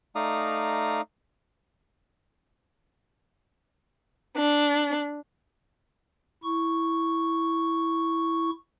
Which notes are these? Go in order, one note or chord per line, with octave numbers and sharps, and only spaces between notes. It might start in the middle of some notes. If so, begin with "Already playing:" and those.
A3 D#4 D5 F5 A#5 D#6
D4
E4 C#6